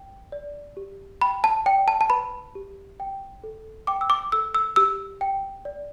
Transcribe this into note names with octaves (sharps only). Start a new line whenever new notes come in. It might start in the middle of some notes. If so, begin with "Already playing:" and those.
Already playing: G5
D5
G4
G5 B5
A5
D5 G5
A5
A5
B4 B5
G4
G5
A4
G5 D6
E6
D6
A4 E6
E6
G4 E6
G5
D5